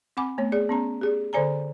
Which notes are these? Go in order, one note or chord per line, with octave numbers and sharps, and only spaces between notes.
C4 F#5 G#5 B5 D6
A3 B3 C#5
G#4 D5
B3 C#4 A#5
G4 G#4 D5
D3 A4 C5 D5 G#5 A#5